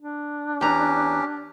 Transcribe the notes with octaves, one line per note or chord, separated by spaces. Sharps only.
D4
E2 C#4 G4 A#5